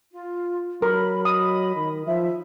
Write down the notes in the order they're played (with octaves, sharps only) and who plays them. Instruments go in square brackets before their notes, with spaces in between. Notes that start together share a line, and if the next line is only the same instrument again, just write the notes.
[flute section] F4
[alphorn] F#3 [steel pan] A#4 [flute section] B5
[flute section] D#5 B5 [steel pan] D#6
[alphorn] D#3
[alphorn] F3 [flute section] E5